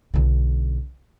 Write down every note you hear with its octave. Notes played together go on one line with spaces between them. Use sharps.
B1 D3